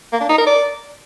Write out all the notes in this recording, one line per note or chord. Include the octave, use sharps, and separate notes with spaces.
A#3
D4
D#4
A#4
D5